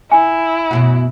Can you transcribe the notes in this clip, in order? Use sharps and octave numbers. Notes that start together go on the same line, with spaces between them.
E4 G#5
F#2 B2 F#4